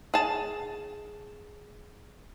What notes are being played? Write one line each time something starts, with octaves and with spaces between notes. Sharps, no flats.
G#4 A5